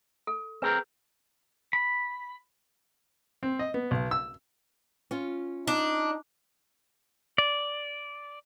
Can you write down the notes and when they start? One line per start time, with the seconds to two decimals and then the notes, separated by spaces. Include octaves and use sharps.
0.27 A4
0.62 C4 G#4 A#4 B4
1.73 B5
3.43 C4
3.59 D#5
3.74 B3
3.91 B1
4.11 E6
5.11 C#4 F4
5.67 D4 D#4
7.38 D5